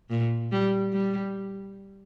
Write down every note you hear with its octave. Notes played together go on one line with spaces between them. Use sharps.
A#2
G3
G3